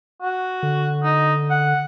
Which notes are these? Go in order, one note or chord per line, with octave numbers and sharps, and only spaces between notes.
F#4
D3
D#4
F#5